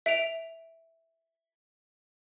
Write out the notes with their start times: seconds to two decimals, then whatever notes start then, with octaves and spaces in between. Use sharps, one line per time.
0.06 E5 D7 F7